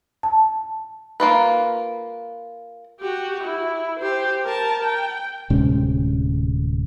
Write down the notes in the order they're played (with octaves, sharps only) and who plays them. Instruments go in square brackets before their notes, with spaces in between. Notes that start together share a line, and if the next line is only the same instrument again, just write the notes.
[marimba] A5
[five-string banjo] A#3 F4 B4
[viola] F#4 G4
E4
G4 C5
A#4 A5
G5
[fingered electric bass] D1 C3 G#3 C#4